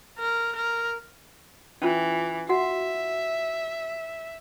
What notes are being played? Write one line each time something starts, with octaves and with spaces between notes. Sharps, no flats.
A#4
A#4
E3 C#4 F4
F#4 E5 F#5